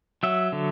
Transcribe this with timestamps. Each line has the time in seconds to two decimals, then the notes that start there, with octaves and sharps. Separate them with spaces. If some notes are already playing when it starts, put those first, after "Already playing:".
0.23 F#3 E5
0.52 D3